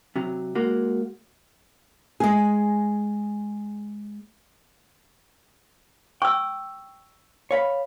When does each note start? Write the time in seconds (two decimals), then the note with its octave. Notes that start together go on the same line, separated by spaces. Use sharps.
0.16 C3 F#3
0.55 G#3 A#3 F#4
2.20 G#3 G#4
6.22 G5 C#6 E6
7.51 C#5 F5 B5